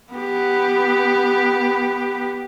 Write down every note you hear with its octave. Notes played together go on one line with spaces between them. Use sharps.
B3 G4